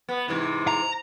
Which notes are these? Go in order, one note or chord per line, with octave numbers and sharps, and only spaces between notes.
B3
G#2 C3 E3
A#5